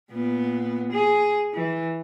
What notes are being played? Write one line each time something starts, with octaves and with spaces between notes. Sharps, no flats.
A#2 B3
G#4
E3